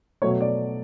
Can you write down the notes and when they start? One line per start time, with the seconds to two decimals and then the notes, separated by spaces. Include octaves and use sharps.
0.22 B2 F#3 A3 C#5
0.41 D5